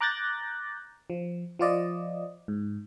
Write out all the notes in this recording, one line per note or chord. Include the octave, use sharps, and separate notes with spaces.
A#5 D6 F#6 G6 A6 A#6
F3
F3 F4 D5 D#5
G#2